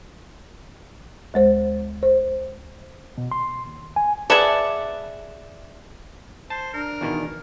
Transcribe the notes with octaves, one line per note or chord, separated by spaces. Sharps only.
D2 G#3 C5
C5
B2
C6
D#2
G#5
G#4 B4 D5 E5 F#5 A5
C5 A5
D4 A#4
E2 B2 D#3